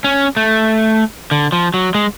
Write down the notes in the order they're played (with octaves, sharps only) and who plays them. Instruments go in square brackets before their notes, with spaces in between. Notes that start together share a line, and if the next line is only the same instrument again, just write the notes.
[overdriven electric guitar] C#4
A3
D3
F3
F#3
G#3